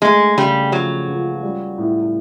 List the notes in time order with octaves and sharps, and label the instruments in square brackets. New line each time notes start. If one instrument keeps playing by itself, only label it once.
[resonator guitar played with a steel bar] G#3 [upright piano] A3
[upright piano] C#3 [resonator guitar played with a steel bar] G3
[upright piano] F3 [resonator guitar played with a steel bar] F#3
[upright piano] C#2
G3
A2